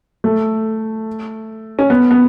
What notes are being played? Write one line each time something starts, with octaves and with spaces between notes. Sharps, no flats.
A3
C#4
B3
B3